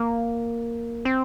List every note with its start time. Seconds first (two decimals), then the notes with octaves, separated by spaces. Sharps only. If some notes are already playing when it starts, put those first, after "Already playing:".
Already playing: A#3
1.05 C4